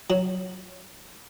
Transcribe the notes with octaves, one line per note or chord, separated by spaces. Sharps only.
F#3